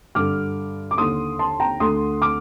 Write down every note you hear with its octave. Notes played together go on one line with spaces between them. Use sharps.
G2 D3 D6 F6
D6
D#2 D3 C6 D#6
A5 C6
G5 A#5
D2 D3 C6 D#6
D6 F6